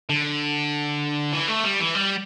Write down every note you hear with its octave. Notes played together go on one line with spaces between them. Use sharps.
D3
E3
A3
G3
E3
G3